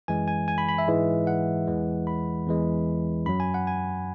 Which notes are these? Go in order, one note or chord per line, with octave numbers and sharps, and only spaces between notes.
F#2 E3 G#3 G#5
G#5
G#5
B5
B5
E5
G#2 E3 G#3
F#5
E2 E3 G#3
B5
E2 E3 G#3
F#2 F#3 B5
G#5
F#5
G#5